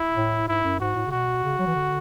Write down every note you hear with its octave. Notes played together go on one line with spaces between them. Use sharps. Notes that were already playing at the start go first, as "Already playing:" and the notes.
Already playing: E4
A2
G#2 E4
F#2
G#2 F#4
A2
C#3
B2 F#4
C#3
F#3
E3
D3